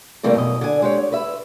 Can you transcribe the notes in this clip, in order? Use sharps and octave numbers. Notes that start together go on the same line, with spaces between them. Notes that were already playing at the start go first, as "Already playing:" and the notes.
C3 E3 G3 A3 A#3 C4
F#2 B2 D#5
D3 G#5
G#3 G4 C#5
C#5
B4 E5